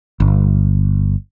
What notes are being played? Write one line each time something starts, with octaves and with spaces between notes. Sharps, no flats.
G1